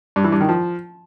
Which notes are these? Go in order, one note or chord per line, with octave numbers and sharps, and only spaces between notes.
G2
E3
G2
D#3
F3